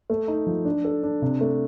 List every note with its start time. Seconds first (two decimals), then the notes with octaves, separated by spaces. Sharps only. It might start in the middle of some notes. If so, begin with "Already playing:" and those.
0.10 A3
0.28 D#4
0.46 F3
0.65 D4
0.85 A4
1.03 D4
1.22 C3
1.41 A3